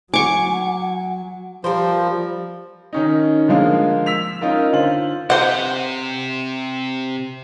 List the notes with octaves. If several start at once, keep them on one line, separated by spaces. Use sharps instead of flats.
F#3 F#5 G#5 C#6 D6
F3 G3 A#4 C5
D#3 C#4 D#4
D3 F3 G#3 A#3
E6 B6 F7
C#4 D#4 F4 A#4
D3 F4 C5 F#7
C3 C5 F#5